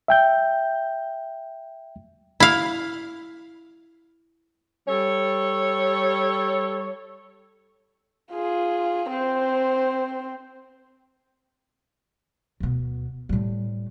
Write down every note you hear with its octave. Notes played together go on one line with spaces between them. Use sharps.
E5 G5 G6
E4 F5
G3 A4 C#5
F4 G#4
C4 C5
D2 B2
A2 G3